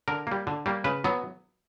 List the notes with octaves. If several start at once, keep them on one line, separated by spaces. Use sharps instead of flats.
D3 A#4
G3 A#3
D3
G3 A#3
C#3 B4
F#3 B3